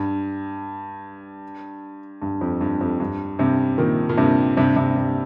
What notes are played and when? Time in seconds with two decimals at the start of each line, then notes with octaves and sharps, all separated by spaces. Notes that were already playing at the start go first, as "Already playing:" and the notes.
Already playing: G2
2.22 G2
2.41 F2
2.61 G2
2.81 F2
3.00 G2
3.39 G2 C3
3.78 A#2 D#3
4.09 A#2
4.17 G2 C3
4.57 G2 C3
4.76 G2 C3
4.96 G2